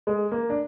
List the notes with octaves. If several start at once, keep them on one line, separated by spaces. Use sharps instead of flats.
G#3
A#3
D4